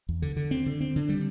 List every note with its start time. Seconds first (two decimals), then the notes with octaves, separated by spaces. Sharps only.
0.09 E2
0.22 D3
0.37 D3
0.51 C4
0.66 D3
0.81 C4
0.96 D3
1.09 G3